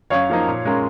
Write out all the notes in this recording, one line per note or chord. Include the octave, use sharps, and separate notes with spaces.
F#2 C#5 F5
F3 A#3 D#4
A#2
G#3 C#4 F4 A#4